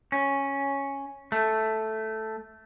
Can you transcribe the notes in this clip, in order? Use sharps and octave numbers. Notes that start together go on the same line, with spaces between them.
C#4
A3